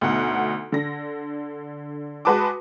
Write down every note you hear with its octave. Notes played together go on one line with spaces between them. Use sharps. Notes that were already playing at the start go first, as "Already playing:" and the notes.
D2 B2 D#4 F#4 F#5
D3 A#6
G#3 F#4 B4 A5 D6